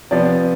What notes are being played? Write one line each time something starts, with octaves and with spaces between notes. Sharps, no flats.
C3 F3 B3 D5